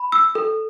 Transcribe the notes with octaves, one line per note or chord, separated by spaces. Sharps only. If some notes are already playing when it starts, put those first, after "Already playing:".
Already playing: B5
E6
A4